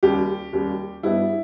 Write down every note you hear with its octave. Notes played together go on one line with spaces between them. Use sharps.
D#2 C#3 G3 G4
D#2 C#3 G3
G2 G3 B3 E4